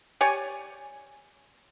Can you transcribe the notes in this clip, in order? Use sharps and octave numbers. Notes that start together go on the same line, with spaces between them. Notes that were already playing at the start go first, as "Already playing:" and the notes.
G4 C#5 D5 G#5